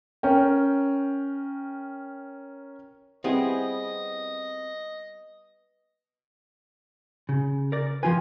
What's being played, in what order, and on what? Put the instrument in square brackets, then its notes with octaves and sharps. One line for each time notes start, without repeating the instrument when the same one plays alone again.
[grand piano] C#4 A#4 G5
[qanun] G3 B3 [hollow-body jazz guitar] C4 E4 G#4 [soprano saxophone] D#5
[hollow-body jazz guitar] C#3
A#4 D5
[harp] F3 G#5 [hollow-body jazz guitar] F4 B4